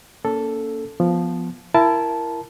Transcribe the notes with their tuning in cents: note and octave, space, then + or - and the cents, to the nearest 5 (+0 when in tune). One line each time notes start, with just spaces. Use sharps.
A#3 +0 C#4 +35 A4 +0
F3 +0 B3 +0
E4 +25 A#4 +0 A5 -10